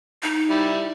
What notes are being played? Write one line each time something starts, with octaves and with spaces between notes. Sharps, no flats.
D#4
G3 E4